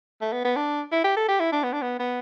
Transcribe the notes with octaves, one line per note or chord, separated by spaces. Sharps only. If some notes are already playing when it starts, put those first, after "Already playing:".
A3
B3
B3
D4
E4
G4
A4
G4
E4
D4
B3
D4
B3
B3